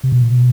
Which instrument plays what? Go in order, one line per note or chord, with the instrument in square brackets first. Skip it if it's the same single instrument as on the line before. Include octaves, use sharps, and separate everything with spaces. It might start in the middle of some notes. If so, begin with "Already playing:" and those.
[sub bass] C3
B2
A#2
B2